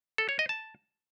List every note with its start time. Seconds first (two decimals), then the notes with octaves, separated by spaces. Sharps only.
0.18 A4
0.29 C#5
0.39 D#5
0.49 A5